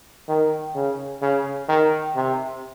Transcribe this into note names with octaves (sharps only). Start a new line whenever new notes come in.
D#3
C#3
C#3
D#3
C3